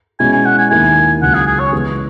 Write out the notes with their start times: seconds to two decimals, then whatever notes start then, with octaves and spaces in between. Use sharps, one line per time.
0.19 B2 G#3 C#4 E4 G#5
0.33 G#5
0.45 F#5
0.58 G#5
0.70 D#2 D#3 A#3 E4 G#5
1.21 C#2 C#3 F#3 C#4 F#5
1.34 G#4
1.47 G#4
1.60 C#5
1.73 C#3 E3 G#3 B3